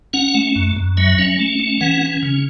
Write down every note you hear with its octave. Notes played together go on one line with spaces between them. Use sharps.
C#4 F#5
A3
F#2
F#2
F#3 E5
C#4
A3
C#4
E3 F#5
C#4
C#3